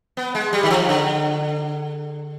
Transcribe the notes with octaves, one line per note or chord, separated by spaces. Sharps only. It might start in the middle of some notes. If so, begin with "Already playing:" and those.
B3
G#3
G3
D#3
F3
D3